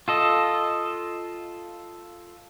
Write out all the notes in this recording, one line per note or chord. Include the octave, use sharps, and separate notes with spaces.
F4 A4 D#5